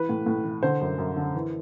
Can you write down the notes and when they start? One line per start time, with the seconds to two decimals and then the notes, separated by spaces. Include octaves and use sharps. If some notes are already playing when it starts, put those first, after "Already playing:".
Already playing: E3 B4
0.09 A2
0.26 A2
0.44 E3
0.63 D3 C5
0.81 F#2
0.98 F#2
1.17 D3
1.35 E3